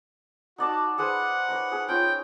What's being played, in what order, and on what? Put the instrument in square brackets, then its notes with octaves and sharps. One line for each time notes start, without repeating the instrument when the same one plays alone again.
[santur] D#4 D5 A5 [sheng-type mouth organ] F#4
[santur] G#4 B4 C5 [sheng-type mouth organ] F#5
[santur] B4 C#5 A#5
G#4 C#5
[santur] C#4 F4 A#5 [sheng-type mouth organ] G5